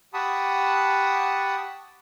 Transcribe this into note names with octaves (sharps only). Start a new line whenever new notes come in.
G4 F#5 A5 B5 C#6 D#6